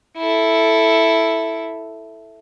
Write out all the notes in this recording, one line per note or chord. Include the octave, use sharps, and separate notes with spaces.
E4 A4